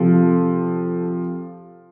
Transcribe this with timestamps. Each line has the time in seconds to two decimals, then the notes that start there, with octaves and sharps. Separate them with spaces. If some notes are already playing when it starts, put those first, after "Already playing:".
Already playing: C3 F3 A4